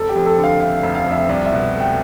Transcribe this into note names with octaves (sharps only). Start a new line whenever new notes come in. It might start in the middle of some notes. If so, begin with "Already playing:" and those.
Already playing: F1 A4
G4
F2
A4
D3
F5
A3 F5
F5
F1
F5
F2
E5
C2 D5
E5
B2
A3 G5